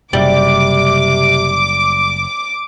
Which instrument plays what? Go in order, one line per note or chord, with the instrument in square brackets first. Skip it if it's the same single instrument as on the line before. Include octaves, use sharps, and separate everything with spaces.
[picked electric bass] F#1 [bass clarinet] C3 [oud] G3 [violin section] D6